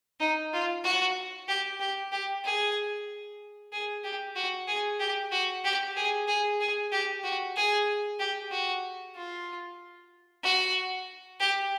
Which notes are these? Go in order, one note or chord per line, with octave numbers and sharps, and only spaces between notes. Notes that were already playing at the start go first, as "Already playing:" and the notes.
D#4
F4
F#4
G4
G4
G4
G#4
G#4
G4
F#4
G#4
G4
F#4
G4
G#4
G#4
G#4
G4
F#4
G#4
G4
F#4
F4
F#4
G4